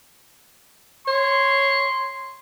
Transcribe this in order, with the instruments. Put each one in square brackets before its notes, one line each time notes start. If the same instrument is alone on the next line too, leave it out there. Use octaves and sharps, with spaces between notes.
[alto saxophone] C#5 [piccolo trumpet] C6